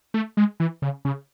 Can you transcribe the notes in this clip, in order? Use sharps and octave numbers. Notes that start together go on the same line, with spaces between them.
A3
G#3
E3
C#3
C#3